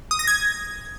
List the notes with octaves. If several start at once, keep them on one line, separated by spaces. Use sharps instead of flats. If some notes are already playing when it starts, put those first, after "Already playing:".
D#6
A#6
G#6